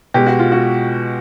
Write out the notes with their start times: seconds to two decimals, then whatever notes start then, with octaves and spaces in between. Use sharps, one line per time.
0.14 B2 G#3 G4
0.27 F#4
0.39 F4
0.52 F#4